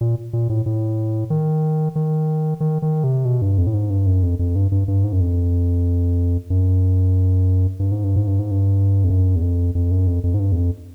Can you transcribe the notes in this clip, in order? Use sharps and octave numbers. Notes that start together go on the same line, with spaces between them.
A#2
A#2
A2
A2
D#3
D#3
D#3
D#3
C3
B2
G2
F2
A2
G#2
G2
F#2
F2
F2
G2
G2
G2
G#2
F#2
F2
F#2
G2
G#2
G2
G#2
G2
G#2
G2
F2
F#2
E2
F2
F2
F#2
F2
F2
G#2
G2
E2
F2